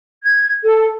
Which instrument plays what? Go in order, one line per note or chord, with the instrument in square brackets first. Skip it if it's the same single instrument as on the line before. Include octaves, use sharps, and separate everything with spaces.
[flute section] G#6
A4